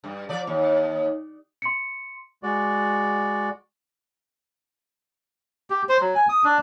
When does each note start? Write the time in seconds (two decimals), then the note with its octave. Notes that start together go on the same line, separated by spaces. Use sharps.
0.04 G2
0.29 F3 D5
0.47 D#2
1.62 C6 C#7
2.43 G#3 F#4 D5
5.70 G4
5.89 C5
6.00 F#3
6.15 G#5
6.29 D#6
6.44 D4